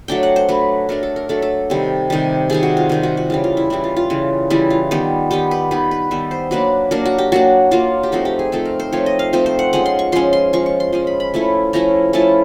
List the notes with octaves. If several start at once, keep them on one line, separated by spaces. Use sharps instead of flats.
F#3 A3 D4 G5
F#5
C5
F#3 A3 D4 B4
F#3 A3 D4 A#4
A4
A#4
F#3 A3 D4 A4
A4
C3 D#3 G3
C3 D#3 G3
C3 D#3 G3 G#4
F#4
F4
C3 D#3 G3 F4
F#4
F#4
C#3 E3 G3 F4
F4
E4
C#3 E3 G3 E4
F4
F4
C#3 E3 G3
C#3 E3 G3 E4
F4
D#3 G3 B3
D#3 G3 B3 G4
B4
D#3 G3 B3 B4
B4
D#3 G3 B3 E5
C5
F#3 A#3 D4 B4
F#3 A#3 D4 A#4
F#4
G4
F#3 A#3 D4 F#4
F#3 A#3 D4 F4
G4
F3 A3 C4 D#4 F#4
G4
G#4
F3 A3 C4 D#4 A4
A#4
C5
F3 A3 C4 D#4 C#5
D#5
F5
F3 A3 C4 D#4 C5
C5
F#5
F3 G#3 C#4 F#5
C6
C#6
F3 G#3 C#4 C6
C6
F3 G#3 C#4 C#6
C#6
C6
F3 G#3 C#4 C6
B5
B5
F3 A3 C#4 E4
F3 A3 C#4 E4 A#5
F3 A3 C#4 E4 A5